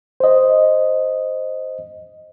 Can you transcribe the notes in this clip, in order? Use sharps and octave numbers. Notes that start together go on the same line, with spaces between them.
C5 D#5